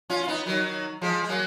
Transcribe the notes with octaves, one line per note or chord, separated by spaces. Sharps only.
C#4 F4
F4
B3 D#4
D#3 F#3
F3 G#3
G#3
F#3 A#3